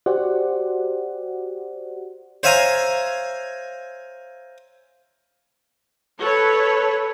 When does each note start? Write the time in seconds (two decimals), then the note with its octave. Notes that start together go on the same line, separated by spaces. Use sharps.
0.06 F#4 G4 C5 D5 F#5
2.43 C5 C#5 E5 F5 G#5 A#5
6.22 A4 B4 C#5